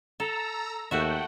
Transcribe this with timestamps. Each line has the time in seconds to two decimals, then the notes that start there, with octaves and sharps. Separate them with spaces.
0.20 A4 A#5 E6
0.91 D#2 A3 F#4 E5 F#5 G5